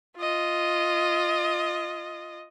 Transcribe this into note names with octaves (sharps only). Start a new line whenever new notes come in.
F4 D#5